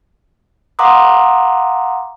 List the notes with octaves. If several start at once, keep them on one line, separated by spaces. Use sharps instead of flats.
F5 F#5 A#5 C6 D6 D#6